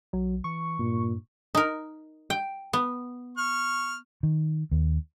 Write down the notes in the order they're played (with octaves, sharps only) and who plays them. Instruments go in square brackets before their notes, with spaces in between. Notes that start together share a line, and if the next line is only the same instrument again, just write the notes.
[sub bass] B1 [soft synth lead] F#3
[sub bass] E3 [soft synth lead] C#6
[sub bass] G2 [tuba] A#2
[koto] D#4 A#4
G5
B3
[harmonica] C#6 F6
[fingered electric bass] D#3
D#2